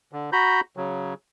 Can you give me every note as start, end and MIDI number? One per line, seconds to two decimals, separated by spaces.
0.13 0.30 50
0.33 0.61 66
0.33 0.61 82
0.33 0.61 83
0.33 0.61 91
0.77 1.14 49
0.77 1.14 54